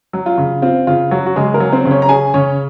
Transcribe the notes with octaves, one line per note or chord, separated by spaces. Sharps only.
F#3
F4
C#3
C4 F4
C#3 F4
F#3 F#4
F#4
C#3 G#3 G#4
A#3 A#4
F#3
C4 C5
C#3
C#4 C#5
A#5
C#4 G#4 G#5
C#3 C#4 C#5